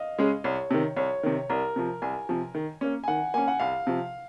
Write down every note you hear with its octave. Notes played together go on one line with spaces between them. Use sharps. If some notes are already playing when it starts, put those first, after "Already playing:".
Already playing: D#5 F5
C#3 G#3 C#4 G#4
C2 C#5
C3 D#3
C2 C#5
C3 D#3
C2 A#4
C3 F3
C2 G#5
C3 F3
D#3
A#3 C#4
G#5
D#3 F#5
A#3 C#4 G#5
F#5
C2 F5
C3 F3